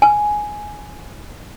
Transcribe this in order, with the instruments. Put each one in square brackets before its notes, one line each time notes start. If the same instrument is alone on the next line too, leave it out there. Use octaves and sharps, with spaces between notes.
[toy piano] G#5